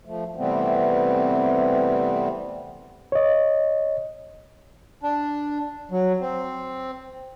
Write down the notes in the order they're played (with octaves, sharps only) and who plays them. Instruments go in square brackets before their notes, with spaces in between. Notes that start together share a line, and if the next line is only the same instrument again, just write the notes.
[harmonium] F3 A3
C3 E3 G3 A3 B3 C4
[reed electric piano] C#5 D#5
[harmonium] D4
F#3
C4